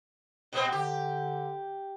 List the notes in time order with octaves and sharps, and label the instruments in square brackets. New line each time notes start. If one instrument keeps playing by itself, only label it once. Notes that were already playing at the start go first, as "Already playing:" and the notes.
[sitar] A#2 B3 C4
[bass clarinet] D3 [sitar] G4